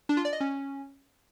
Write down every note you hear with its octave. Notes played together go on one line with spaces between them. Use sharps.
D4
F4
D5
D#5
C#4